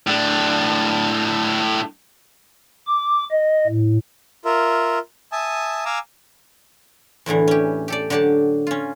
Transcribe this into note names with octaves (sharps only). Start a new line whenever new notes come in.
A2 D4
D6
D#5
A2
F4 A#4 E5
E5 G#5 A5 D#6
F5 G#5 A#5 D6 E6
E2 A2 D3 E3
C#4 G4
G4 A4 D5
D3 F#3 G4 D5 A5
C#4 F4